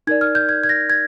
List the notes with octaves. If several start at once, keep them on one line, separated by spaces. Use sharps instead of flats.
D#4 A#4 D5 G#6
F6
G6
G#6
G#6
A#6
G#6